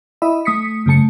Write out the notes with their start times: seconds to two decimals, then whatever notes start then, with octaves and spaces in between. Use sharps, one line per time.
0.22 E4 D#5 E5 B5
0.45 A3 D#6 B6 C#7
0.86 F#2 C#3 A3 A5 C#7